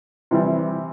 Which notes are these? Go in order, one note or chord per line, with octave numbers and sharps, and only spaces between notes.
C3 E3 G3